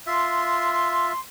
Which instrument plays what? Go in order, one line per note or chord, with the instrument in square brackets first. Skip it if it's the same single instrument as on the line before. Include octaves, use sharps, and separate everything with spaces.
[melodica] F4 E5 [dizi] C6